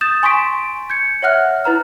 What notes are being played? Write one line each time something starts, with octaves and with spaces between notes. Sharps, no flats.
D#6 G6 A6 E7
G#5 C6 C#6 A6 B6 D7
G6 G#6 C#7
C#5 E5 F#5 F6 F#6
E4 B4 A#5 F6